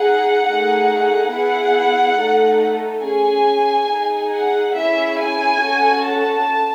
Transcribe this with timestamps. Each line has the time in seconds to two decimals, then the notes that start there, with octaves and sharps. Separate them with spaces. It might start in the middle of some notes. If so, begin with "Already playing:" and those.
Already playing: D#4 G#4 F#5
0.46 A3 D#4 G#4
1.32 B3 E4 G#4 F#5
2.18 A3 D#4 A4
3.05 C#4 G#4 G#5
3.90 D#4 G#4
4.34 F#5
4.77 C#4 E4 G#4 E5
5.20 G#5
5.63 C#4 F#4 A4
6.06 A5